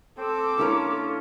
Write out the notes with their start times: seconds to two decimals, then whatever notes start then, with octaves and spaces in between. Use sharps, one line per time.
0.18 C4 A4 D6
0.58 D3 A#3 C#4 E4 F4 A#4